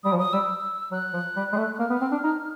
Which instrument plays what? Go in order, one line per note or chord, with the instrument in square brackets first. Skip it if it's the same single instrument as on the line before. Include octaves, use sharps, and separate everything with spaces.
[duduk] G3 [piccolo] D#6
[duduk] F3
[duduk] F#3 [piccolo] D#6
[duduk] G3 [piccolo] E6
[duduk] F#3 [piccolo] F#6
[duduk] F3
G3
G#3
A3
[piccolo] F#6
[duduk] A#3 [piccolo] F6
[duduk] B3
C4
D4
D#4